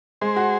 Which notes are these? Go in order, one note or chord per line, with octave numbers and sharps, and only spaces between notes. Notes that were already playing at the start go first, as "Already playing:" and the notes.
G#3 G#4 C5
F#4